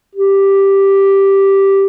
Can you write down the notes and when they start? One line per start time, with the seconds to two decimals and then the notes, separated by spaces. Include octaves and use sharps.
0.15 G4